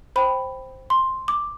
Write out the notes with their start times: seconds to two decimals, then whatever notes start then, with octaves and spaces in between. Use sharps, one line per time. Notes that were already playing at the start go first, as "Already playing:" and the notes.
0.16 C5 G5 B5
0.90 C6
1.28 D6